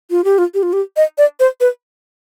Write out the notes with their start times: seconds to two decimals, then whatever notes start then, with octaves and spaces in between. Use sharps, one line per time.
0.11 F4
0.24 G4
0.38 F4
0.54 G4
0.63 F4
0.73 G4
0.97 D#5
1.18 D5
1.40 C5
1.61 B4